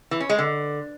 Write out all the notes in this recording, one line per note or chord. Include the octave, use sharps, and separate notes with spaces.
E3
C#4
G#3
D3